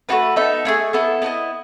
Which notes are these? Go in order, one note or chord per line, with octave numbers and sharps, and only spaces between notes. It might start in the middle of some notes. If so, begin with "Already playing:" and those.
A3 D#4 F#4 B4
B3 D#4 A4 E5
A3 E4 G#4
B3 E4 A4
B3 E4 B4 D#5